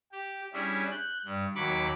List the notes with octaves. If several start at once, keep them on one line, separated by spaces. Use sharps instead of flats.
G4
G3 C#4 D4 E4 G#4
F#6 G6
G2
D#2 F#3 B5 C#6 D6